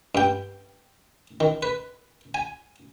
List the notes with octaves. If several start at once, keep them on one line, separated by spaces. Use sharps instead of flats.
G2 G5
D#3
B4
G#5